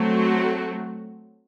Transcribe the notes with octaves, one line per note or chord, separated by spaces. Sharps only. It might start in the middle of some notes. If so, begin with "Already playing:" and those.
Already playing: F#3 A3 C4
F#4